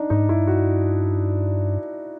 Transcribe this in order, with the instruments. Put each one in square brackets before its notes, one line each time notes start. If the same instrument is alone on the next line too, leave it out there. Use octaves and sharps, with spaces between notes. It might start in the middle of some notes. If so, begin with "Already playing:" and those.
Already playing: [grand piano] D4 D#4
[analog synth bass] G#2 [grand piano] D#4
[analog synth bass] G2 [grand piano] E4
[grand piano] F#4